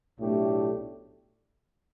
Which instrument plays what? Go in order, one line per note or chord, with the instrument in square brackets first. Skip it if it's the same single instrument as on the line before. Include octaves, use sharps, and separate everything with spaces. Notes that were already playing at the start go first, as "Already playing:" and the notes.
[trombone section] B1 A2 A3 D4 G4